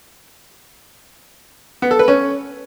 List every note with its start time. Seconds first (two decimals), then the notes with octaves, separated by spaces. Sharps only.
1.82 B3
1.91 A4
1.99 B4
2.08 C#4